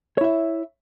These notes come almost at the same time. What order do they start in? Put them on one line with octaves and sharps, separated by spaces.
C#5 E4 E5